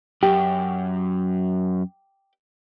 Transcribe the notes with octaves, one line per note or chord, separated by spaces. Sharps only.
F#2 G4